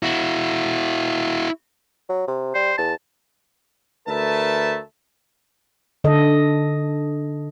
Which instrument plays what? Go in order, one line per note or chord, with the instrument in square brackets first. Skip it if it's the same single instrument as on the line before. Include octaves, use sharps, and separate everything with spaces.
[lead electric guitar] E4 F#4
[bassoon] F#3
C3
[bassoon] G3 [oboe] C5
[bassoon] E2 [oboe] A5
[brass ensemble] D2 A3 A#4 B4 E5 A5
[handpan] D3 A4 D#5